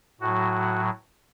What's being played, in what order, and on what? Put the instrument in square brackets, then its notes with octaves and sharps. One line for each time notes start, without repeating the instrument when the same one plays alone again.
[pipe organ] A2 F#3 F#4